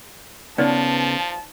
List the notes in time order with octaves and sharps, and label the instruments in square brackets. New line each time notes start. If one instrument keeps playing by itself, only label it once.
[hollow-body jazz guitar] C#3 B3 [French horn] F3 [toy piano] D#4 B4 D5 [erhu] A5